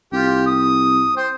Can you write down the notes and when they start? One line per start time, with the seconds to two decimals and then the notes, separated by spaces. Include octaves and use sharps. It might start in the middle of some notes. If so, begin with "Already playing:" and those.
0.13 C2 F4 G4
0.46 D#6
1.17 C5 G5